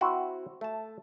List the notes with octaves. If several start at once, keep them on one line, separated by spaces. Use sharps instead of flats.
C4 E4 F#4 C5
A3 A5